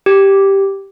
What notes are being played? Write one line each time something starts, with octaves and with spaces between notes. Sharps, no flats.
G4